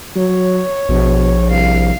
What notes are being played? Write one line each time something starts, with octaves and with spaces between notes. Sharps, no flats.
F#3 C#5
A#1 B2
C2 F5